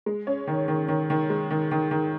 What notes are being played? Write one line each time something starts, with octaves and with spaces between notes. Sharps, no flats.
G#3
C#4
D#3
D#3
D#3
D#3
G#3
D#3
D#3
D#3